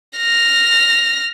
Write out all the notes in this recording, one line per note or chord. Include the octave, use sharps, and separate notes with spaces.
F6 A#6